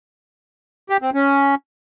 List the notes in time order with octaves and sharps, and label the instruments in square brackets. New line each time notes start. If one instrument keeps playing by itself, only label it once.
[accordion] G4
C4
C#4